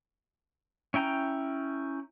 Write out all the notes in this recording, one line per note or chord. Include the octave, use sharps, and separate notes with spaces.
C#4 E4 G5 A#5